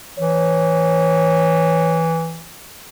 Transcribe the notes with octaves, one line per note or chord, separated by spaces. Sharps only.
E3 C#5